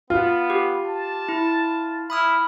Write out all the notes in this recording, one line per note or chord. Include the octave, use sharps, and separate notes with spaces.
B3 F4
G4
A5
E4
E4 B5 D#6 F6